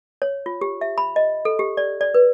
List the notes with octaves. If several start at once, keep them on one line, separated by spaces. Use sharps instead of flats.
C#5
F4
G4
E5
B5
D#5
A4
G4
D5
D5
B4